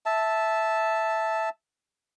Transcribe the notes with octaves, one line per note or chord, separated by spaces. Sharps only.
E5 A5